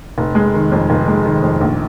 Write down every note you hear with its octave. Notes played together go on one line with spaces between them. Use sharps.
F1
G#3
D#3
F2
F1
G#3
D#3
F2
A#1